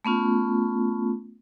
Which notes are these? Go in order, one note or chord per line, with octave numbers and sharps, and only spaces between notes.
A3 B3 C#4 F4